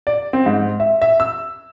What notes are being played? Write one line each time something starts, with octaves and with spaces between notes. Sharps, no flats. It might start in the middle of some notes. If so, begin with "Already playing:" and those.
D5
C4
G#2
E5
E5
E6